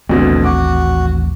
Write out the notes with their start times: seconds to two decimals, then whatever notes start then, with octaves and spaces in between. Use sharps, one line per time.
0.09 D#1 A1 D2 B2 D3 C4
0.44 F#4 D6